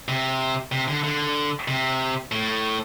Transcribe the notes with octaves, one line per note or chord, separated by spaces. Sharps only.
C3
C3
D3
D3
C3
A2